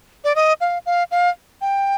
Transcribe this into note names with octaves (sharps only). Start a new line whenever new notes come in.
D5
D#5
F5
F5
F5
G5